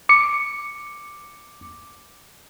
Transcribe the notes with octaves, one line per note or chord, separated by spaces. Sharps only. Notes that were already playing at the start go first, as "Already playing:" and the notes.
D6 C#7